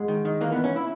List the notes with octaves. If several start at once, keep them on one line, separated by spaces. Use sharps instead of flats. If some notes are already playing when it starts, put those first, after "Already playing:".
Already playing: G#2 G#3
D#3
D#3
E3 A#3
G#2 B3
C#4
E4